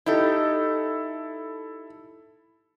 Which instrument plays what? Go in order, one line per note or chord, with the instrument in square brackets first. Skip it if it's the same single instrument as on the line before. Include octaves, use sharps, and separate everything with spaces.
[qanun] D#4 G4 [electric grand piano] E4 A4